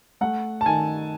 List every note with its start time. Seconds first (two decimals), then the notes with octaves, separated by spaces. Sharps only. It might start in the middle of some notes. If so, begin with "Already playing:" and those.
0.21 A3 F#5
0.61 A5
0.66 D#3 G#5